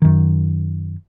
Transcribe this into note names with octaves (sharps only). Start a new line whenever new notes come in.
F#2 D#3